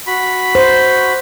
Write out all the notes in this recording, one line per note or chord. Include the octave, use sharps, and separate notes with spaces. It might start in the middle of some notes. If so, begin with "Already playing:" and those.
F#4 B5
C5